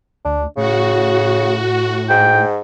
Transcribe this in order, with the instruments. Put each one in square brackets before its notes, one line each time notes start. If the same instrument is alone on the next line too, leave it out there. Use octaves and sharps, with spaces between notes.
[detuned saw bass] D2 [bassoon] D4
[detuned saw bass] A2 [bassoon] C#3 [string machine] F#4
[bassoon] G#2 [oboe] G5